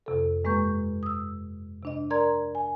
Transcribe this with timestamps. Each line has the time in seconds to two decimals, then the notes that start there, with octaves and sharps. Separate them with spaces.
0.06 F2 C3 A4
0.44 G2 G#3 A#3 B4 C#6 G6
1.03 D#6 E6
1.83 C3 D4 D#5
2.10 A#4 D5 A#5 C6 G#6
2.55 G#5